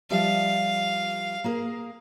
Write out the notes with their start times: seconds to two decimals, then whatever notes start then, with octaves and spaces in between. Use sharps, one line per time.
0.10 F3 G3 E5 F5
1.44 A#3 G#4 A#4